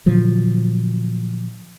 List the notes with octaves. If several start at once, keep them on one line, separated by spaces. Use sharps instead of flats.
A#2 D3 F3 F#3